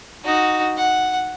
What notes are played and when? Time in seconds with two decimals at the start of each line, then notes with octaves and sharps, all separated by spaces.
0.24 D#4 F#4
0.77 F#5